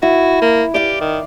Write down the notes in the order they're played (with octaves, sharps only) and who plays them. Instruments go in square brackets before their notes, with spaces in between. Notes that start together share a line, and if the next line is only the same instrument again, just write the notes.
[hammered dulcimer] E4 [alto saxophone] F#4
[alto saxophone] A#3
[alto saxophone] G4 [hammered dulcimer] D5 F5
[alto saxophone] D#3